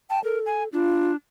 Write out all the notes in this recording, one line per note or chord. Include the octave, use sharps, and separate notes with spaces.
G5 A5
A4 A#4
G#5
D4 F4